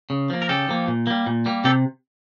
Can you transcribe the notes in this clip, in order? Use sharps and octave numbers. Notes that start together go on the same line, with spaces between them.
C#3
F3 A#3
A#4
C#3 G4 A4
F3 A#3
A#2
G3 A#3
A#2
G3 A#3
C3 G4 A4